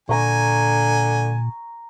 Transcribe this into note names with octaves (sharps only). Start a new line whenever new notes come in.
A#2 D3 G#5 A#5 C#6